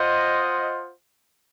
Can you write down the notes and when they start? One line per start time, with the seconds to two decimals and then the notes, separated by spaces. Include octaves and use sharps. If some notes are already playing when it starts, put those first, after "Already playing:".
Already playing: F4 C5 D#5 F#5